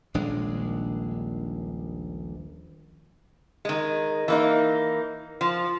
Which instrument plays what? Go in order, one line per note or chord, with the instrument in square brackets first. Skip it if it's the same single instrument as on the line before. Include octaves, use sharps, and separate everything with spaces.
[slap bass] D#1 A#1 G#3 D4
[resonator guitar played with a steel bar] D#3 G#3
E3 A#3 D#4
F3